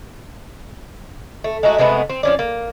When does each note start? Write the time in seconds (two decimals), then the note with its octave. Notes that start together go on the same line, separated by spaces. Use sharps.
1.44 A3
1.63 G#3 A3 D#4 F#4
1.78 C3 G#3 A3 B3
2.10 C4
2.23 F3 C#4 D5
2.39 A#3